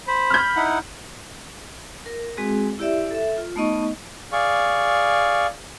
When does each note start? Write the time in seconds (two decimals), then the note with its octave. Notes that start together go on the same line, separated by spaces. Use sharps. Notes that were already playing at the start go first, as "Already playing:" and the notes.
0.08 C5 B5
0.30 F6 G6
0.56 D#4 E4 F#5
2.06 A#4
2.37 G#3 C4 F#4 G#4
2.79 E4 G4 D5 E5
3.11 A4 E5
3.38 F4
3.56 A3 B3 D#4 D#5 C#6
4.32 G#4 D5 F5 C#6